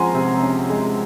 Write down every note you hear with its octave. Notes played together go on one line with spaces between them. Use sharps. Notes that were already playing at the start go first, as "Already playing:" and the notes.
Already playing: F3 G#3 C#4 F#5 G#5 A#5 C6
C3
C#4
G#3